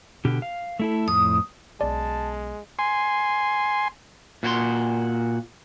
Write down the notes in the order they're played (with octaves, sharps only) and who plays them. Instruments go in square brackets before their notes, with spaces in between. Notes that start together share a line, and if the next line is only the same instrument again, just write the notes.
[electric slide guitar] B2 D3 G4
F5
A3 E4 A4
[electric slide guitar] F2 A2 [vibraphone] D#6
[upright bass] B1 C#3 [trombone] G#3 [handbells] D5 [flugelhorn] A5
[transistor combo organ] G#5 C6
[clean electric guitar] A#2 F#4 C5 C6